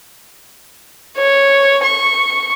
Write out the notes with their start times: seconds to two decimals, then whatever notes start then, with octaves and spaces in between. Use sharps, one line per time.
1.17 C#5
1.83 C#6